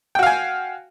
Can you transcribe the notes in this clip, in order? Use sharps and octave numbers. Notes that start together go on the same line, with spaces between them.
F#4 F5 G5 G#5